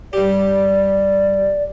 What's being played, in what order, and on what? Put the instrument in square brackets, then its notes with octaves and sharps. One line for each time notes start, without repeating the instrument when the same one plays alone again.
[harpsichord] G2 G4 [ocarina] D5